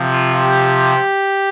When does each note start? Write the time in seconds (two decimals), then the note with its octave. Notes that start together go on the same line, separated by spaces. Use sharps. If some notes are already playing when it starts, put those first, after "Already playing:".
Already playing: C3 F3
0.12 F4
0.41 G4